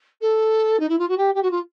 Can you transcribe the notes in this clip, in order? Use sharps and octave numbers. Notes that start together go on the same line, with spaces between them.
A4
D#4
E4
F4
F#4
G4
G4
F#4
F4